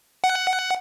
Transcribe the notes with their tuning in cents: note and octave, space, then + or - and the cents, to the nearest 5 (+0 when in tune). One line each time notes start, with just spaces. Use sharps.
F#5 +10